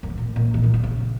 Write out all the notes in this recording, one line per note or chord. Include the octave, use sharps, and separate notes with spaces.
F#2
G#2
A#2
A#2
D#3
C#3
B2
C#3